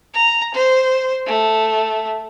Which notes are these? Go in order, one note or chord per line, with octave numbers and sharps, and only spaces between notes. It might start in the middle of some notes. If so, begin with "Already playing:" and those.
A#5
C5
A3